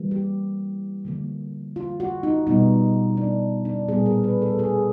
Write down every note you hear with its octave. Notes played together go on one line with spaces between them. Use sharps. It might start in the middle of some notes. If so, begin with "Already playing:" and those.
Already playing: E3 G3 A#3
G4
D3 F3 A#3
F4
F#4
D#4
B2 G3 B3 D#4
D4
D4
A#2 G3 B3 G#4
A#4
B4
A4
G#4